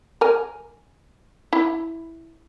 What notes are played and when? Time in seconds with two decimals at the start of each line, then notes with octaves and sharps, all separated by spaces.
0.21 A#4 G#5
1.53 E4